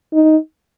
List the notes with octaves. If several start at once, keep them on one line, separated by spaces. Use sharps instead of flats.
D#4